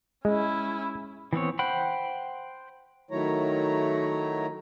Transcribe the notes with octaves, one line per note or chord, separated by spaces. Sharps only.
G#3 C#4 E4
E3 B3 C4 C#5
C5 F#5 G5 B5
D#3 F#3 A3 E4 C#5 A#5